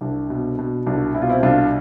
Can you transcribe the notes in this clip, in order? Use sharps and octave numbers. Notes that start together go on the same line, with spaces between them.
C2 D4
B2
B2
C2 D4
B2 E4
F4
C4 E4
C2 D4 F4